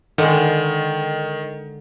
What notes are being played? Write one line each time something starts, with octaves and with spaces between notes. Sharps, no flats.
D3 D#3 G#3